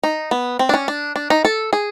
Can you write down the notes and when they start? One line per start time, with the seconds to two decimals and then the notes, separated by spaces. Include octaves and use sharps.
0.03 D#4
0.31 B3
0.59 C4
0.69 D4
0.74 C#4
0.88 D4
1.16 D4
1.30 D#4
1.45 A4
1.73 G#4